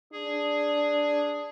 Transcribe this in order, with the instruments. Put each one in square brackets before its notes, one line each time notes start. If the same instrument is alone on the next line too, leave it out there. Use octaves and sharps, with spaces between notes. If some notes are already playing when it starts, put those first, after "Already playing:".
[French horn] D4 [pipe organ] G#4